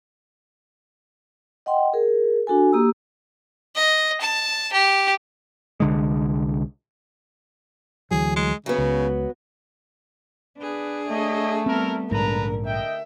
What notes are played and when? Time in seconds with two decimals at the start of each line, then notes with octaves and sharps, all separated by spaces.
1.66 D#5 F#5 G5 C6
1.93 G#4 A#4
2.47 D4 F#4 A4 G#5
2.72 A#3 G4 A#5 D#6 E6
3.76 D#5
4.21 A5
4.73 G4
5.80 C2 D3 G#3
8.11 D2 E3 F#3 G#4
8.36 G#3
8.66 C#3 F#3 B3
8.78 C#2
10.58 B3 D4 G#4 B4
11.08 A3 C#5 D#5
11.66 G3 B3 C4 E4 A4 A#4
12.11 A#1 G#2 D3 G3 A#4 B4 A5 A#5
12.66 D#5 E5 G5